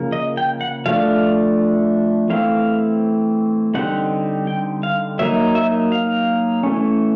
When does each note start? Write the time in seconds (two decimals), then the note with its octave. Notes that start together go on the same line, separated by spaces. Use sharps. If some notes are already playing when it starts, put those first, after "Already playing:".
Already playing: C#3 F3 A#3
0.12 D#5
0.37 G5
0.61 F#5
0.86 F3 A3 D4 F5
2.29 E3 A3 C4 F5
3.74 D3 G3 C4 D#4 F#5
4.47 G5
4.83 F5
5.19 F#3 A#3 D#4 E5
5.55 E5
5.92 F5
6.63 E3 A3 C#4